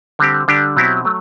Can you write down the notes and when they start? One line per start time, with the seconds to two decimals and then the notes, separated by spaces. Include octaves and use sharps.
0.19 D3 G3 C4 G4
0.48 D3 G3 D4 G4
0.77 B2 F#3 C4 E4 G4
1.05 F#3 A3